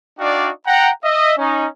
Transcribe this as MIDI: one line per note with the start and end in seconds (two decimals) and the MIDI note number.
0.19 0.50 62
0.19 0.50 63
0.19 0.50 66
0.19 0.50 74
0.19 0.50 77
0.19 0.50 79
0.66 0.90 78
0.66 0.90 79
0.66 0.90 82
1.04 1.35 75
1.04 1.35 76
1.38 1.66 61
1.38 1.66 63